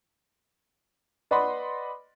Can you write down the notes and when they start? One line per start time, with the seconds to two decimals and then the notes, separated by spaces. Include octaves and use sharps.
1.31 B4 D5 D#5 F#5 B5 C6